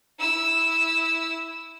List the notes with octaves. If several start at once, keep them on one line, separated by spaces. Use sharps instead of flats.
E4 E6